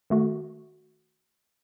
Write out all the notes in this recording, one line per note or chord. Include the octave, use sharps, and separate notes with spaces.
D#3 A3 F#4